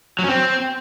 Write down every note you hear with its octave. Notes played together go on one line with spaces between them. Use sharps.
F#3
C#4
C4